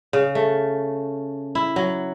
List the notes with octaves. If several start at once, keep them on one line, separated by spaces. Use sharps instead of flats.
C#3
A3
E4
F#3